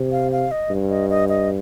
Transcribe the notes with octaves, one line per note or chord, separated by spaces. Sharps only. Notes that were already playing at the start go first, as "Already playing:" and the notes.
Already playing: C3
F5
F5
D#5
G2
D#5
D#5
D#5